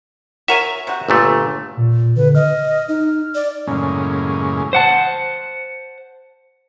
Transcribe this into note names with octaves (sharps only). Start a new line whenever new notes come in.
F#4 A#4 C#5 E5 G#5
C3 F#4
G1 A#2 A3
A#2
D3 B4
D#5 F6
D#4
D5
F#2 A2 C#3 G#3 A#3 C#4
C5 F#5 A5